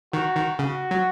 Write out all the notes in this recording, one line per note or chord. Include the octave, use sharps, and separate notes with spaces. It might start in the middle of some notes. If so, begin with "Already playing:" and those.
D#3 F#4
D#3
C#3 F#4
F#3